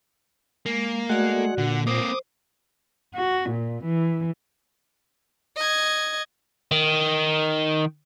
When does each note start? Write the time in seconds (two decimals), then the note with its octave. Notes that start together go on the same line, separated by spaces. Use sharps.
0.66 G#3 A#3
1.09 G#3 A3 F#4 D5 F#5
1.58 A#2 D3 F#5
1.87 A#3 C4 C5 D6 D#6
3.15 F#4
3.50 A#2
3.84 E3
5.57 D#5 G#6
6.72 D#3